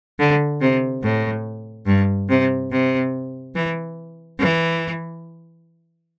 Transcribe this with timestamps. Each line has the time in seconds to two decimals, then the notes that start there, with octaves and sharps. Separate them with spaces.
0.20 D3
0.61 C3
1.03 A2
1.87 G2
2.30 C3
2.72 C3
3.55 E3
4.39 E3